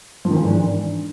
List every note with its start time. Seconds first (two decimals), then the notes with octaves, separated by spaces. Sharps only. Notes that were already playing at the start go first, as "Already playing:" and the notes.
0.25 F3
0.31 D#3
0.36 E3
0.42 G#2
0.48 D4